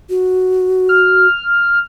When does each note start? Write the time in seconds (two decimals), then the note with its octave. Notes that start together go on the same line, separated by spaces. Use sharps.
0.10 F#4
0.89 F6